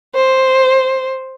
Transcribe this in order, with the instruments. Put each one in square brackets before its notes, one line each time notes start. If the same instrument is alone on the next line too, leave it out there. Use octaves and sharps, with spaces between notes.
[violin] C5